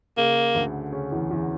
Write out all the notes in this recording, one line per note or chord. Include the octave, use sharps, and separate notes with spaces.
C#3 A#3
D2 D3
C#3 C#4
E2 E3
E2 E3